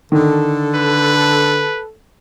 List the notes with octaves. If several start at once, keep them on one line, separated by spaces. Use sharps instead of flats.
D3 D#3 A4
B4